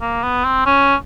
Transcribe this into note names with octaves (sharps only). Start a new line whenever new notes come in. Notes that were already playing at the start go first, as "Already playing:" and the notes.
A#3
B3
C4
C#4